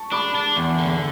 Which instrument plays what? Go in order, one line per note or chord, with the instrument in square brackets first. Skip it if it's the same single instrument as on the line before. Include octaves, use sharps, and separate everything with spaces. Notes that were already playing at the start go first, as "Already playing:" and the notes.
Already playing: [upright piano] A5 C#6
[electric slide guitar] D4 [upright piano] B5 D6
[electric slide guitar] D4
E2
D3